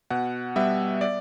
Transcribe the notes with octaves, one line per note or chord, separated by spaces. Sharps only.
B2 F#5
G3 B3 E5
D5